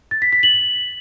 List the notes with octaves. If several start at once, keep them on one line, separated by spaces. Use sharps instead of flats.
A6
B6
B6
F#7